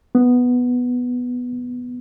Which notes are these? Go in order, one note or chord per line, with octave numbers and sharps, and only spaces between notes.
B3